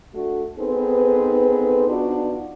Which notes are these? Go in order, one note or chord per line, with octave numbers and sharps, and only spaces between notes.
A3 D4 F#4
B3 C4 D#4 G#4 A4 B4
B3 D4 D#4 F4 F#4